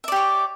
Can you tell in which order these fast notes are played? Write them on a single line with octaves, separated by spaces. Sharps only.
E5 D5 G4 C#5